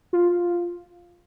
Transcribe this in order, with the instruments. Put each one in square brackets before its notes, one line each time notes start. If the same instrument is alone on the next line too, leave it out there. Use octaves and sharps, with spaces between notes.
[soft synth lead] F4